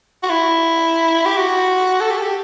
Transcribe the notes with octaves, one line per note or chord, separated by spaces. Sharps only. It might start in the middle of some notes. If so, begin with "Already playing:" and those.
F#4
E4
G4
F#4
A4
G4
A4
G4